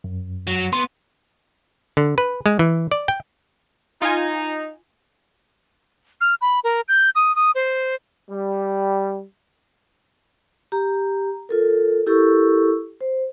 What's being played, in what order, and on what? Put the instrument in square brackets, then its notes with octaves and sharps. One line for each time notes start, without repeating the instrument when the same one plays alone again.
[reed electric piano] F#2
[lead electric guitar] F#3
[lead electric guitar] B3 [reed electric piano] C6
[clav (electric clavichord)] D3
B4
G#3
E3
D5
G5
[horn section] D#4 [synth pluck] F4 G#5
[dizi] F6
B5
A#4
G6
D#6
D#6
C5
[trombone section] G3
[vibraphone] G4 A#5
F4 A4 A#4
E4 G4 A4 A#4 C#6 E6
C5